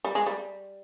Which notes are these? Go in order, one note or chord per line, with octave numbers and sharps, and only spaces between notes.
G3
G#3
G3